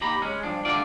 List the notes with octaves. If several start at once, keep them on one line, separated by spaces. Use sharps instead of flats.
D#2 G4 A#5 B5
G#3 C#4
G2 F3 D4
D3 G3 A3 D4 F4 D5